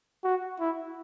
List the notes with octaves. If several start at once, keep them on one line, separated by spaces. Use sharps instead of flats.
F#4
E4